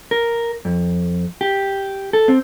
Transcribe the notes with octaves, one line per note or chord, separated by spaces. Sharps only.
A#4
F2
G4
A4
C4